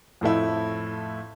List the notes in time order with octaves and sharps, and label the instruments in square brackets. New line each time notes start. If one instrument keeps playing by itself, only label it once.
[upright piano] F2 A2 A3 E4